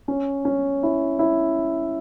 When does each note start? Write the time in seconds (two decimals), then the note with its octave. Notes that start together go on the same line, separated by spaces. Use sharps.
0.08 C#4
0.45 C#4
0.83 E4
1.19 E4